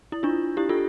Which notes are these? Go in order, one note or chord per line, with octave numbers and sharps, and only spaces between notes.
E4
D4 F4
E4 G4
F4 A4